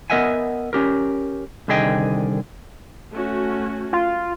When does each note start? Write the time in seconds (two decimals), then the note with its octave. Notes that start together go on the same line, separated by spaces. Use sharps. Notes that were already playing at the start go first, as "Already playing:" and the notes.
0.10 B3 A#4 D#5 E5 F#5 G#5
0.73 C#4 G4 A#4
1.68 C2 D3 D#3 G#4 D#5 G5
3.13 A3 C#4 F#4
3.93 F4